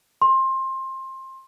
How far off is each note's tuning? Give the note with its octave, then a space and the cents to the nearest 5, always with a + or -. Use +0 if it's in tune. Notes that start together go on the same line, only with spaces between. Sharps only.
C6 +20